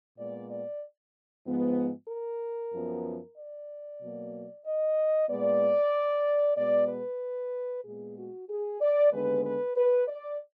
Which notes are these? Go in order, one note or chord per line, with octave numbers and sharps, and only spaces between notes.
A#2 G#3 B3 D5
D5
G#2 F3 G#3 B3
A#4
F#2 F3 B3
D5
B2 F#3 A#3
D#5
A#2 G#3 B3 D5
B2 G#3 B3 D5
B4
A#2 G#3 B3 G#4
F#4
G#4
D5
D#2 D3 G#3 B3 B4
B4
B4
D5